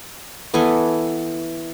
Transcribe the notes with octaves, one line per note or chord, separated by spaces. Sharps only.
E3 B3 A4 G#5